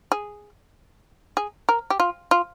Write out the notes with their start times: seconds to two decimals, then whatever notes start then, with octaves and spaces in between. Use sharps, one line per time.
0.12 G#4
1.37 G#4
1.69 A#4
1.90 G4
2.00 F4
2.31 F4